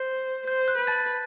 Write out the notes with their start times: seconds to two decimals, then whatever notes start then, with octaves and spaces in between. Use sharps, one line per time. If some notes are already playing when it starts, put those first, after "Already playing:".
Already playing: C5 G6
0.47 C5 G6
0.68 F#6
0.78 B4
0.87 A5 A6